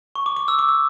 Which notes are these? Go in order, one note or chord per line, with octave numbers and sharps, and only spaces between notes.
C#6
D6
D6
E6
D6
E6